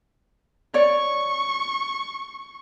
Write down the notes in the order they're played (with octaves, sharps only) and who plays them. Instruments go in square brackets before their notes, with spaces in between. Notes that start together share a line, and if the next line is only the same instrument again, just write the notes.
[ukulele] C#5 D5 [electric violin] C#6